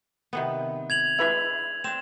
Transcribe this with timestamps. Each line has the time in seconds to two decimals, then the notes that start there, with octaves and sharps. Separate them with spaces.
0.33 C3 D#3 B3
0.90 G#6 F7 F#7
1.19 G#3 D4 E4 B4 E5
1.84 C4 D4 E7